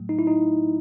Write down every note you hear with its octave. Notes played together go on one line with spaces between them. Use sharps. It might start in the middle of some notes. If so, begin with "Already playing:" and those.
Already playing: A2 F#3 A3
D#4
E4
D#4